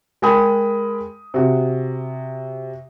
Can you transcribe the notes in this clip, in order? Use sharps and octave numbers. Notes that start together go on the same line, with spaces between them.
G#3 A#4 G5 G#5 B5 D#6
C3 F#4